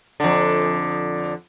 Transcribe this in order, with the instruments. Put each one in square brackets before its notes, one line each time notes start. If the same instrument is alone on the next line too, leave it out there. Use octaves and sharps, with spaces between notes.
[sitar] F2 D3